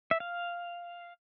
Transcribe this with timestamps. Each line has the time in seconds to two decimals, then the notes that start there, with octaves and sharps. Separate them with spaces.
0.11 E5
0.20 F5